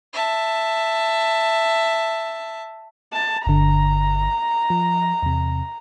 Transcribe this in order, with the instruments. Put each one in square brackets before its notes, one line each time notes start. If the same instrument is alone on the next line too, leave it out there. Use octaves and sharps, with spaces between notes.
[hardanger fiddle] E5 A5
[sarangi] A5
[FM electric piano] G1 D3 [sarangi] A#5
[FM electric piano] F3
E2 C3